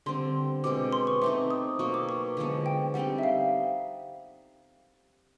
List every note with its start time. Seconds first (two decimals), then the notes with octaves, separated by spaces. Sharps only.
0.06 D3 G3 C4 C6
0.64 B2 G#3 C4 D6
0.92 C6
1.07 C#6
1.21 A3 C4 D#4 D6
1.50 D#6
1.79 B2 F#3 A#3 C#6
1.94 D6
2.09 C#6
2.37 D3 F3 G#3 B3
2.66 G5
2.94 G3 C4 D#4 F#5
3.18 E5
3.23 F5